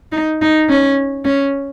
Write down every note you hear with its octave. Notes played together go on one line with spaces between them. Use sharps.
D#4
D#4
C#4
C#4